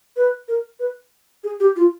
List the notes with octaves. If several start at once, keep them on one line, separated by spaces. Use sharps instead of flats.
B4
A#4
B4
G#4
G4
F4